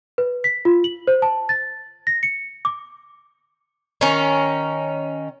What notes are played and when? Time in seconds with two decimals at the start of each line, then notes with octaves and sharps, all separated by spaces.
0.18 B4
0.44 B6
0.65 F4
0.84 F#7
1.07 C5
1.22 A5
1.49 A6
2.07 A#6
2.23 C#7
2.65 D6
4.01 D#3 C#4